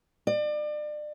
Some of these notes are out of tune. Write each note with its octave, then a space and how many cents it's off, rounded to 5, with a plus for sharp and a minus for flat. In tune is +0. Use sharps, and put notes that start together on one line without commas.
D5 +35